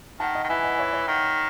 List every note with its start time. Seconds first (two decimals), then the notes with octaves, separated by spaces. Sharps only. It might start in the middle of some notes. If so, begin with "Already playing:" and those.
0.20 D#3 F#5 A5
0.35 D#5 F#5
0.44 D#3
0.49 E3 E5 G#5
0.64 D#5 F#5
0.79 C#5 E5
0.93 C#5 E5
1.08 D#3 D#5 F#5